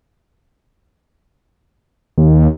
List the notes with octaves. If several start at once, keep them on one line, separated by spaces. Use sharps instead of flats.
D#2